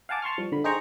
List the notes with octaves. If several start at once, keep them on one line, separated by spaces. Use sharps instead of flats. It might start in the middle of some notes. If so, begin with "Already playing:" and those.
F5 F#5 G#5 A5 D6
A5 C6 C#6 F6
F3 G3
D3 B5
D#4 G#4 C5 G5 A#5 C#6